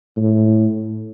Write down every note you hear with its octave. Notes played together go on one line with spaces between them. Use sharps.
A2